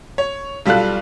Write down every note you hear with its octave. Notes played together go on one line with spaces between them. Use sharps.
C#5
B1 G3 F4 A4 F5 F#6